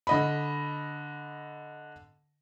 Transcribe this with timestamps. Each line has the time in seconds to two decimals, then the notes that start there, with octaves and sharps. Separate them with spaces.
0.07 D3 D#5 B5